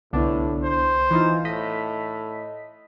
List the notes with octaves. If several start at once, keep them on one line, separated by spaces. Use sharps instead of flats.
C2 A2 D3 B3 D4 E4
C5
E3 D#4 F4
A2 D#5 B6